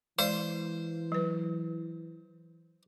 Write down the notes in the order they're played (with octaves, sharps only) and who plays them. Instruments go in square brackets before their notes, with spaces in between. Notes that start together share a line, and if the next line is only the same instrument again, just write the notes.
[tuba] E3 [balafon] G#3 D5 C6 [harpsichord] C5
[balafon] F#3 B4